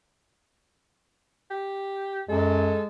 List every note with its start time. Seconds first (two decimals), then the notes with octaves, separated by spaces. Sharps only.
1.51 G4
2.29 F#2 G#3 A4